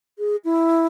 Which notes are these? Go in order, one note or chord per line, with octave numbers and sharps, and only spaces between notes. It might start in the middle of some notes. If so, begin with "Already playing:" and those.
G#4
E4